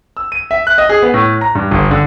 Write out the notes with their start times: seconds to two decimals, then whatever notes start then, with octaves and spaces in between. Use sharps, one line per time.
0.17 E6
0.32 D#7
0.51 E5
0.67 F#6
0.78 D#5
0.89 G#4
1.02 B3
1.14 A2
1.41 A#5
1.55 G2
1.71 G1
1.91 D3